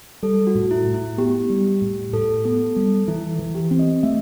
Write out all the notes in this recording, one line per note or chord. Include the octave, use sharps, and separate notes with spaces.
G3 A4
F#4
A2
E4
A2
E4
B3 G4
G3
A2
A2 A4
B3 A4
G3 A4
E3 E4
E4
E3
G4
C4
D#5
A3 E5